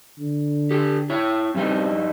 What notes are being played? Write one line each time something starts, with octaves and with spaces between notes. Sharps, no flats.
D3
G4 A4
E4 C#5
G2 G3 C4 D#4